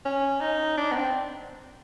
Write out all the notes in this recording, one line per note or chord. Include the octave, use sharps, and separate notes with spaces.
C#4
D#4
D4
B3
C4